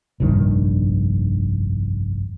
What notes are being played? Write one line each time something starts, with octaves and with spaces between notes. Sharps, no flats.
F1 A#1 G2 D#3